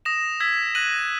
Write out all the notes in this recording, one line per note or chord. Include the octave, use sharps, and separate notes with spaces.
D#6 A#6 E7
E6 G#6 B6
F#6 A#6 D#7 F#7